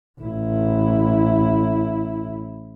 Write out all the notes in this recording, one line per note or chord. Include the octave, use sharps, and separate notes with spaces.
A1 E4